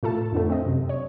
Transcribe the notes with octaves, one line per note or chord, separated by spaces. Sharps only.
A2 F4 A4 A5
F2 D3 A3
C4 D#5
F#2 C3
C#5